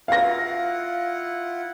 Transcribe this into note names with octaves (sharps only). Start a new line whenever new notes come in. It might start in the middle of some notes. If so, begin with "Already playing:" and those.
E4 F4 F5 F#5 A#6